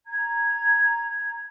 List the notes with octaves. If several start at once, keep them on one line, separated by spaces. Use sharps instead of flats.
A#5 G#6